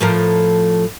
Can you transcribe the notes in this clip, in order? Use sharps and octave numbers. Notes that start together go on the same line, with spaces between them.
A2 F3 A#4